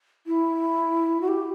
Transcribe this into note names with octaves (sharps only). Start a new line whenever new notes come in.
E4
F#4
G4